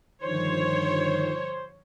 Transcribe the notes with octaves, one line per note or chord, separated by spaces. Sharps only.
G2 D3 D#3 F3 C5 C#5